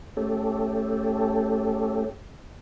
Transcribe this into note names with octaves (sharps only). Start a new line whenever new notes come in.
A3 C#4 G4 A4